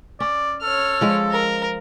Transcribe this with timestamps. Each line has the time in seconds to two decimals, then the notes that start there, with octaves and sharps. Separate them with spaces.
0.20 C#4 D5
0.63 A4 C#5 F6
1.01 F3 G#3
1.32 A#4